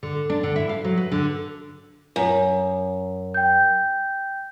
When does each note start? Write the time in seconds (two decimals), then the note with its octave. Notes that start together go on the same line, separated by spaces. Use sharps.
0.03 D3
0.30 D4
0.43 D3
0.56 E4
0.69 F5
0.85 F#3
0.97 B4
1.12 D3
2.16 F#2
3.34 G5 G6